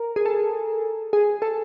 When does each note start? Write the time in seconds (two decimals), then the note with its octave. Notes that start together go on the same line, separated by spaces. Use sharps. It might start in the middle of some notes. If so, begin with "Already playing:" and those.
Already playing: A#4
0.16 G#4
0.26 A4
1.13 G#4
1.42 A4